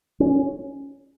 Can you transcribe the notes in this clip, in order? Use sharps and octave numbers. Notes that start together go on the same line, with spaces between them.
C#4